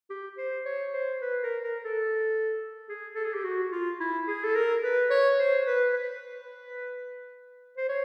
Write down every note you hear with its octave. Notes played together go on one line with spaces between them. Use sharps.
G4
C5
C#5
C5
B4
A#4
A#4
A4
G#4
A4
G#4
G4
F#4
F4
E4
G#4
A4
A#4
B4
C#5
C5
B4
B4
C5
C#5